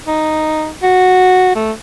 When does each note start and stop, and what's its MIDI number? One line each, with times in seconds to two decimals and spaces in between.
0.06 0.70 63
0.83 1.55 66
1.55 1.72 57